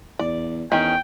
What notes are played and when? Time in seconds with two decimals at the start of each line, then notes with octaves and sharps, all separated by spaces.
0.19 E2 D5
0.72 E2 D#3 C#4 G5